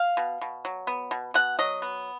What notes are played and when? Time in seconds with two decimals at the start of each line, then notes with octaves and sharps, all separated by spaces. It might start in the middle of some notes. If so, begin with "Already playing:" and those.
Already playing: F5
0.17 B2
0.41 B2
0.65 F#3
0.87 B3
1.11 B2
1.34 B2 F#5
1.59 F#3 D#5
1.82 B3